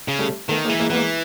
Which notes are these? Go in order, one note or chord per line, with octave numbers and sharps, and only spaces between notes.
C#3
G3 A3
D#3 A3 B3
G#3 A#3
E3
G#3 A#3
E3 G#3 A#3 B3